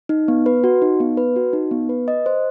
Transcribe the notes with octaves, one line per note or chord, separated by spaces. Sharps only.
D#4
B3
B4
F#4
D#4
B3
B4
F#4
D#4
B3
B4
D#5
C5